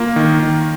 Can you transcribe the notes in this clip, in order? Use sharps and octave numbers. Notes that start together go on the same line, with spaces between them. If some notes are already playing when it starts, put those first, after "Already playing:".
Already playing: A#3 F4
D#3
D#3